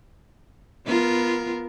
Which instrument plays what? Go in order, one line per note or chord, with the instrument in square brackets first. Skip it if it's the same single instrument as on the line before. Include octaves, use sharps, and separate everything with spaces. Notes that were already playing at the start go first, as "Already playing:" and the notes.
[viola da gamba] B3 F4 A#4